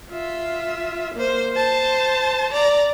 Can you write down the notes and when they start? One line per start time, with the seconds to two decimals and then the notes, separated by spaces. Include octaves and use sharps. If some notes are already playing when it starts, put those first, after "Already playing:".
0.11 F4 E5
1.14 A#3 C5
1.54 C5 A5
2.53 D5 A#5